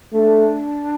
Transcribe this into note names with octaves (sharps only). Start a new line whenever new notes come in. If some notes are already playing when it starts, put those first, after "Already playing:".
A3 D4